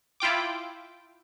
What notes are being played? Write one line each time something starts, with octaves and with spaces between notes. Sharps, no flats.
E4 F4 G5 D6